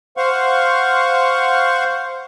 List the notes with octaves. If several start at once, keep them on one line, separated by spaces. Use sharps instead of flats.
C5 F5 F#5 C#6